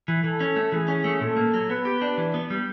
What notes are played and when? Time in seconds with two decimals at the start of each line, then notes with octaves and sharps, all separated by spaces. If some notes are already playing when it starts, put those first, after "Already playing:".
0.08 E3
0.24 E3 A4
0.40 C#4
0.56 A3
0.72 E3 G#4
0.88 C#4
1.04 A3
1.20 A#2 A4
1.36 A#3
1.54 F#3
1.69 B3 B4
1.85 G4
2.02 D4
2.18 E3
2.34 B3
2.50 G3